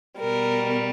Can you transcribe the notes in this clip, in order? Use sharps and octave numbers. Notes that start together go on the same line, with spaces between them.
B2 G3 A#4